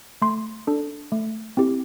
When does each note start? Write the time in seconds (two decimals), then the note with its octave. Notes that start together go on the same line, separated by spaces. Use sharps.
0.22 A3 C6
0.67 D4 A4
1.12 A3
1.57 C4 E4 G4